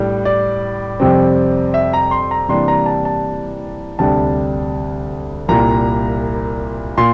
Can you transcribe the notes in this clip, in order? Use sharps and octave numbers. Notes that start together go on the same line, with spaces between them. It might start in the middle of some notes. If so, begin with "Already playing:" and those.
Already playing: A2 G3 D4
D5
F2 C3 G3 C4
E5
A#5
C6
A#5
C3 E3 G3 A#3 D4 C6
A#5
A5
A5
D2 C3 G3 D4 A5
C2 A#2 G3 A#3 A#5
A#2 C6